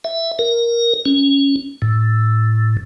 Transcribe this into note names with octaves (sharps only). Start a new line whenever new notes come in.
E5
A#4
C#4
A2